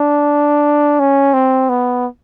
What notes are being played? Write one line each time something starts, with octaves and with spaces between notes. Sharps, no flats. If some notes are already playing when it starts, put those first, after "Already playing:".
Already playing: D4
C#4
C4
B3